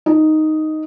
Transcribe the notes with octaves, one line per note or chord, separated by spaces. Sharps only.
D#4